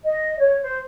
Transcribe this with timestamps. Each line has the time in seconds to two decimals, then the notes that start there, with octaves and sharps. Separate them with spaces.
0.05 D#5
0.39 C#5
0.63 C5